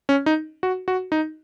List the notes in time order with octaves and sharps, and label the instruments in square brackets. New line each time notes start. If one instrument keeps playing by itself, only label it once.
[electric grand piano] C#4
D#4
F#4
F#4
D#4